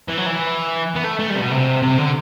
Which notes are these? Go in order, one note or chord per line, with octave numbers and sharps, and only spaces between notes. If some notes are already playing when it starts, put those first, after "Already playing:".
E3
F#3
E3
B3
A3
A3
G3
C3
B2
C3
C3
D3